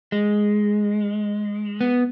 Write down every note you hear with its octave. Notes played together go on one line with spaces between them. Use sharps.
G#3
B3